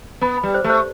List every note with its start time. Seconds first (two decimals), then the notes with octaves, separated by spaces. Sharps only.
0.21 B3 B5
0.38 B5
0.43 G3
0.54 C5
0.64 A3
0.70 C5